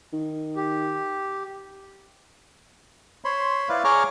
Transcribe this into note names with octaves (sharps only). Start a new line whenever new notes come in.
D#3
G4
C5 C#5 B5 C6
E4 B4 D5 F5
G#4 C#5 A#5 C#6 D6 F6